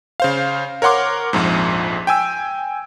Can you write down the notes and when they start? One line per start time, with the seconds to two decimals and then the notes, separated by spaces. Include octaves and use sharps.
0.20 C#3 C5 F5
0.82 A#4 C#5 F#5 C6 D6
1.33 A#1 F2 G#2
2.07 G5 G#5 E6